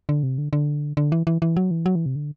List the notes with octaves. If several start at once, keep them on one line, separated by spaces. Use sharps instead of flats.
D3
C3
D3
D3
D3
E3
E3
E3
F#3
E3
F#3
E3
C3
D3